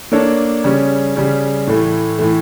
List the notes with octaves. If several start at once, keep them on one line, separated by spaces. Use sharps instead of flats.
A#3 D4 A4 C#5
C#3 G3 C#4
C#3 G3 C#4
A2 E3 A3
A2 E3 A3